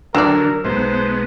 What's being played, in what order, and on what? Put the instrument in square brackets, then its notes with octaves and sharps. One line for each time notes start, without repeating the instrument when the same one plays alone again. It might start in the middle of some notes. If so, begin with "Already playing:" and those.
[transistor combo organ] D3 F#3 [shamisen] D4 D5 [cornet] A#4 [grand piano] E6 E7
[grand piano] B1 [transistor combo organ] G#3 B3 [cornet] C5